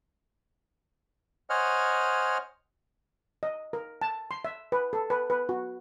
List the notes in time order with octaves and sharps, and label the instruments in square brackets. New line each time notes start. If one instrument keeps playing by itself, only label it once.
[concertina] C5 C#5 D#5 F#5 G#5 F6
[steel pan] D#5
A#4
A5
C6
E5
B4
A4
B4
B4
F#4